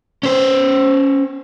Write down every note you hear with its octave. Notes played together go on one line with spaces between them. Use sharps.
C#4 C5